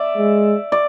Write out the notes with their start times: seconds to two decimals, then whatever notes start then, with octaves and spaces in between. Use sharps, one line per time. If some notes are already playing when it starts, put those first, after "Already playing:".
Already playing: D5 E5
0.17 G#3
0.72 D5